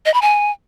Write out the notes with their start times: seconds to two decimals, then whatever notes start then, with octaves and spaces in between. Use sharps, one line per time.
0.06 D#5
0.14 B5
0.22 G#5